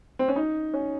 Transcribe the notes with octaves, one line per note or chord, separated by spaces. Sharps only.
C4
C#4
D#4
C#4